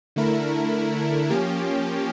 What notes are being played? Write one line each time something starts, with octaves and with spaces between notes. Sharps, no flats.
D3 A3 E4 A#4
F3 A#3 C#4 G4